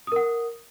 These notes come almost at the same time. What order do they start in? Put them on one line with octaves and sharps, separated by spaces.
D#6 A#4 F#5